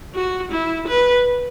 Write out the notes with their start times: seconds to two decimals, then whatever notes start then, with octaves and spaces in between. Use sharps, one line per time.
0.15 F#4
0.52 E4
0.88 B4